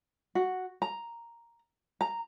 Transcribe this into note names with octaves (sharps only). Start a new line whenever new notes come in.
F#4
A#5
A#5